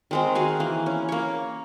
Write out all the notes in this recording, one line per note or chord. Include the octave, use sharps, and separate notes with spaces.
D#3 G#3 C4
F#4 G#4 F5
E3 A#3
C#4
A#3 C#5